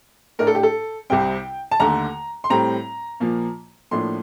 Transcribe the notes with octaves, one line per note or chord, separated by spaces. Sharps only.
A2 A3 D4 A#4
A4
G4
A4
C2 C3 G3 C4 G5
A5
D#2 D3 A3 A#5
C6
A2 G3 C4 A#5
A#2 F3 A#3
A2 F3 A#3 D4 C6